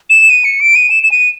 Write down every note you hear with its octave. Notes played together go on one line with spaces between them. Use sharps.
E7
D#7
C#7
D7
D#7
E7
E7
D#7